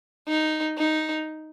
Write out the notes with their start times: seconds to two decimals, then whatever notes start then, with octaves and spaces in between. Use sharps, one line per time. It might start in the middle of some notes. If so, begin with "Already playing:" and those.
0.28 D#4
0.78 D#4